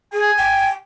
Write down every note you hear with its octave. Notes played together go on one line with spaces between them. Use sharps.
G#4 G#5
G5